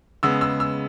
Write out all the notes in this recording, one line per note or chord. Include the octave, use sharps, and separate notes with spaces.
C#3 G#3 B3 E6
E6
E6